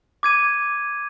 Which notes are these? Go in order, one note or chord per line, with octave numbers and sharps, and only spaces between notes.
D6 G#6 D#7